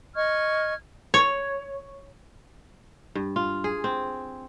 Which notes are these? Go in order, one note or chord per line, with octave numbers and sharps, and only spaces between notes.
D#5 C#6 F6 G#6
C#5
G2
F4
G#4
C4